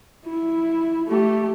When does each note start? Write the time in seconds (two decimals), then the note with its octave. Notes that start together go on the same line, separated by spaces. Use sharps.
0.25 E4
1.07 A3 G4